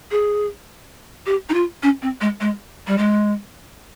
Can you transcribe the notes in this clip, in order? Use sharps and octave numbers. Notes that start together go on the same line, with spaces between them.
G#4
G4
D#4
F4
C#4
C4
G#3
G#3
G3
G#3